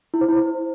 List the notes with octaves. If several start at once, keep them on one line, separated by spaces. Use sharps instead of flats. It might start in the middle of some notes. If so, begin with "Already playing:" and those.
E4
C5
E4
C5